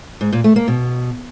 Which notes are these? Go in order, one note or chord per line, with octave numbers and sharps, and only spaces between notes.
G#2
A#2
A3
A#3
B2